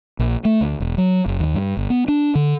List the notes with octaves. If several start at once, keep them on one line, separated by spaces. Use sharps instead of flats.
A#1
A3
D2
E1
F#3
F#1
D#2
G2
G1
B3
D4
D3